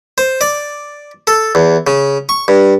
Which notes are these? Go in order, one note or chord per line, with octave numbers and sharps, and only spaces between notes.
C5
D5
A4
E2
C#3
C#6
G2